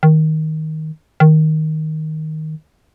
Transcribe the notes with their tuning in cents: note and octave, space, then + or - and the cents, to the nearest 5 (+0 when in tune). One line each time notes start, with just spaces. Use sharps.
D#3 +10
D#3 +5